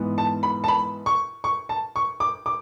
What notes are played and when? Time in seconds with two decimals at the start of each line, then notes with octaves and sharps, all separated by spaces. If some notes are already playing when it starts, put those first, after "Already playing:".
Already playing: G#2 E3 B3
0.18 A5
0.43 B5
0.64 A5
0.68 B5
1.06 C#6
1.44 C#6
1.69 A5
1.96 C#6
2.20 D6
2.46 D6